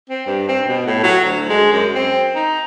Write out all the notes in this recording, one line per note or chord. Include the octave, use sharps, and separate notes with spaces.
C4
G2
C4
B2
A2
F#3
D2
G#3
F#2
C4
D#4